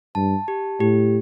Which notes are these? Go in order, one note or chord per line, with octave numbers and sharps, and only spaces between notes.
G2 A5
G4
A2 G4